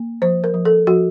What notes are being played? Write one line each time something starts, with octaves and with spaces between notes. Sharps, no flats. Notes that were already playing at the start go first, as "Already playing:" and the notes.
Already playing: A#3
F3 C5
A#4
F3
A4
F3 F#4